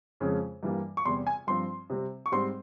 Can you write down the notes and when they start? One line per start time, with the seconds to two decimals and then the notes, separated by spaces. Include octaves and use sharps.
0.20 F2 C#3 F3 G#3 C#4
0.63 G2 E3 G3 A#3
0.97 C#6
1.05 E2 C3 G3 C6
1.27 G#5
1.47 G2 F3 C4 C6
1.90 C3 G3 C4
2.26 C#6
2.32 G#2 G3 C4 C6